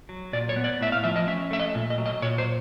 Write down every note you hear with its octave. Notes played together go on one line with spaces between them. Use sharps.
F#3
A#2 D5
C#5
B3
D5
A2 E5
F5
F3 E5
D#5
C#4 E5
A3 E5
D#5
A#2
D#5
F#3
D#5
A#2 C#5
C5